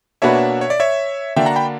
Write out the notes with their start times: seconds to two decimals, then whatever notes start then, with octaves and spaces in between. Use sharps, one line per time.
0.22 B2 A#3 D4 F#4 B4 C#5 E5
0.61 C#5
0.70 D5
0.80 C#5 E5
1.36 D3 A#3 D4 F#4 E5 G5
1.46 F#5 A#5
1.56 G5 B5